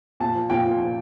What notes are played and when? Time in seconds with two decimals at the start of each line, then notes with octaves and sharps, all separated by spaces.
0.20 A#2 A5
0.35 F3
0.50 A#2 G5
0.65 F3
0.79 A#2